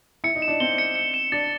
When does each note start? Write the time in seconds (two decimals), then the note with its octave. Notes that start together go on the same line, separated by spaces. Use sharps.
0.24 E4 C#7
0.35 D#4
0.42 E7
0.48 D4
0.60 C4 G7
0.78 C#7
0.96 C#7
1.14 E7
1.32 D4 A6